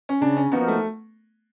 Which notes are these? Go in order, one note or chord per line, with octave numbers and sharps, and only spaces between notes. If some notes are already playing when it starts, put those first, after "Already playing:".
C#4
C#3 D4
C#4
F3 A#3 B3 D#4 F#4
A3